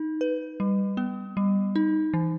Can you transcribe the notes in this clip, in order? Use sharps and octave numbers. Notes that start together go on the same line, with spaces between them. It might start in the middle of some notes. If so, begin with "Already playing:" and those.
Already playing: D#4
B4
G3
B3
G3
D#4
E3